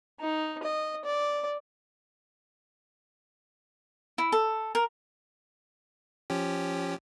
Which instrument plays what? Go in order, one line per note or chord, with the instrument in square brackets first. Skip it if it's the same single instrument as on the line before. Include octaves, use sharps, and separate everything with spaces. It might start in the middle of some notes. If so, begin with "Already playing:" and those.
[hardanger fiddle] D#4
D#5
D5
[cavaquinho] E4
A4
A#4
[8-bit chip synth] F3 C#4 G4